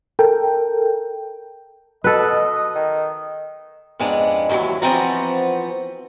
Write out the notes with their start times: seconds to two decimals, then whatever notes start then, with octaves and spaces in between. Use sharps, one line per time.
0.19 A4 A#4 G5
2.04 B2 A4 B4 D#5
2.75 D#3
3.99 F2 G#2 G#3 B3 D4
4.49 D#2 A2 D#3 E3 F#3
4.82 E3 F3 B3 C4 F#4 A#5